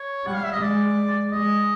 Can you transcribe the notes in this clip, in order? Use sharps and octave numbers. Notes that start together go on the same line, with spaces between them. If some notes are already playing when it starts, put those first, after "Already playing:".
Already playing: C#5
G3 F#5
F5
E5
D#5
G#3 D5
G#3 D#5